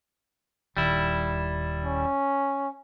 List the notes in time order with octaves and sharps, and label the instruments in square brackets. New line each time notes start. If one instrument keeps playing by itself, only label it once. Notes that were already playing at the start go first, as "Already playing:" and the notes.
[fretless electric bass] D#1 D#2 [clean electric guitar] G3 E4
[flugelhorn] C#4